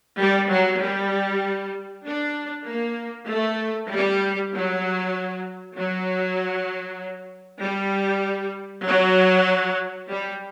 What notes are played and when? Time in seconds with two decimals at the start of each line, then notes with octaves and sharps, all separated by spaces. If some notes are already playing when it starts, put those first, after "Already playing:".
0.20 G3
0.51 F#3
0.81 G3
2.05 D4
2.67 A#3
3.28 A3
3.91 G3
4.52 F#3
5.76 F#3
7.60 G3
8.85 F#3
10.09 G3